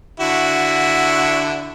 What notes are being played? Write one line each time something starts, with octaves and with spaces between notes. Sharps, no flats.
D3 E4 F#4